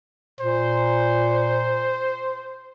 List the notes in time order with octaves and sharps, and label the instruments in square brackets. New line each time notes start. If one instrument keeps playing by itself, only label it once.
[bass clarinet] A#2 [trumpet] C5